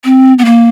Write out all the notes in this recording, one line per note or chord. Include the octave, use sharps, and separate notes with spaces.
C4
B3
A#3